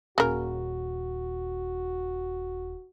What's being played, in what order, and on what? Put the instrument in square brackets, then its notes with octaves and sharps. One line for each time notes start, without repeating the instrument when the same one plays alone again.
[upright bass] D#1 [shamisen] C#3 A#4 [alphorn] F#4